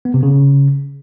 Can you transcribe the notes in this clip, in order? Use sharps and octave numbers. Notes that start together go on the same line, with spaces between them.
B3
C3
C#3